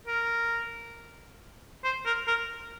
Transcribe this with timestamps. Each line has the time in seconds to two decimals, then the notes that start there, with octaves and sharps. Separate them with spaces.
0.07 A#4
1.84 C5
2.06 A#4
2.27 A#4